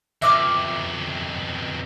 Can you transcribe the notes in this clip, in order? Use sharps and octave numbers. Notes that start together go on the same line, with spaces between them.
F2 B2 E5 D6 F6